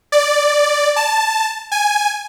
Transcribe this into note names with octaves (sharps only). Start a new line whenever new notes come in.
D5
A5
G#5